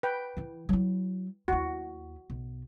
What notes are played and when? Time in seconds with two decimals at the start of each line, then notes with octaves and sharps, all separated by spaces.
0.03 B4 G5
0.37 E3 E4
0.69 F#3 E4
1.48 D#2 E4 F#4
2.30 B1